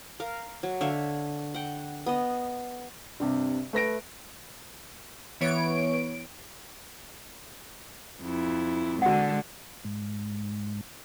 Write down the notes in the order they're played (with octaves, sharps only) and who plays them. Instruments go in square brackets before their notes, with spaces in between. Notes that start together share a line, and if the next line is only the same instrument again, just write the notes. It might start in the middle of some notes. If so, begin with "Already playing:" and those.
[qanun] A#4 F5
F#3
D3 C#5 E5 F5
F#5 G5
B3 D#5
[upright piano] G2 C3
A3 B4 A#6 D7
[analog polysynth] E3 B3 C#5 D7
[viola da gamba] F2 E4
[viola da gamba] D3 G#3 [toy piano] F#4 F#5
[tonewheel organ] G#2